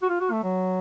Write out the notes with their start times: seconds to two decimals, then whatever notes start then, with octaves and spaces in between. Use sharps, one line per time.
0.02 F#4
0.09 F4
0.20 F#4
0.32 A3
0.43 F#3